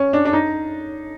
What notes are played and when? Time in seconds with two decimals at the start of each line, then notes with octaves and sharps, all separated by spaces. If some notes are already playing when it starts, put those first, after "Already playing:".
Already playing: C#4
0.13 D4
0.25 D4
0.33 D#4